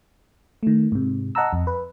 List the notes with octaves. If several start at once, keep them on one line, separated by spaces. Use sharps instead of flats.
D#3 A3
G#2 C3
D#5 F#5 A5 A#5 E6
F2
B4